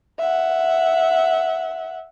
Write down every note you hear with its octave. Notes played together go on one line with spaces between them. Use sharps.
E5 F#5